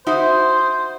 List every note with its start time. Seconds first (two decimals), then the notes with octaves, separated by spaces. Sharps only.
0.07 D#4 E4 F#4 C5